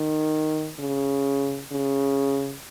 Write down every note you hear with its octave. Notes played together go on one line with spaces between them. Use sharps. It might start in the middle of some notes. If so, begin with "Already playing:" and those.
Already playing: D#3
C#3
C#3